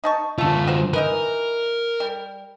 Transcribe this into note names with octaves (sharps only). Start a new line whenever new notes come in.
D#4 A5 C#6
D3 A3 F4 A4
F#4 C5
E3 D#4 A#4 B4
G3